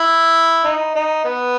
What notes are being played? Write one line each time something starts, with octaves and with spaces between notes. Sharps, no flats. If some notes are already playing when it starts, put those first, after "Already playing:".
Already playing: E4
D#4
D#4
B3